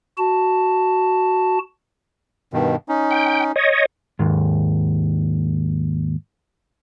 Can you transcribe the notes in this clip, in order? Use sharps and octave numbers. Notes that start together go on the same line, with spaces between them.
F#4 A5
G2 B2 D#3
C#4 D#4
G5
C#5 D#5
D#2 G#2